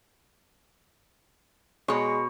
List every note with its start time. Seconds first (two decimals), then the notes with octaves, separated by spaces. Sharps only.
1.88 B2 G#3 C#5